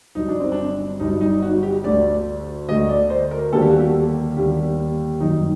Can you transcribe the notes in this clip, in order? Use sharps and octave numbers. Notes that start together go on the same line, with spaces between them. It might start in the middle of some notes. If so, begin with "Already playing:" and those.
G1 G2 F#3 D#4
D4
C4
D4
G1 G2 F#3 D#4
D#4
F#4
G4
D2 D3 A3 D5
D2 D3 A3 D#5
D5
C5
A#4
D#2 D3 G3 A#3 A4
G4
F#4
G4
D#2 D3 G3 A#3 G4
G1 F#2 D#3 D#4